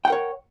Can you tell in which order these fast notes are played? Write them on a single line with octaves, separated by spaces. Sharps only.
G5 F#5 A#4 C#5